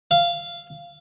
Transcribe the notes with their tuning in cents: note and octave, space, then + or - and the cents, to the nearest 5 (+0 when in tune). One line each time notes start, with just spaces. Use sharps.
F5 -10